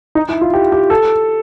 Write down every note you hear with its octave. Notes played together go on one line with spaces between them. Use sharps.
D#4
E4
F4
G4
G4
A4